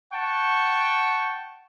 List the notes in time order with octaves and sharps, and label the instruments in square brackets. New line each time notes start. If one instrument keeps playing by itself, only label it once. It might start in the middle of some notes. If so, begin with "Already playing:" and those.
[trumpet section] F#5 G5 A5 C#6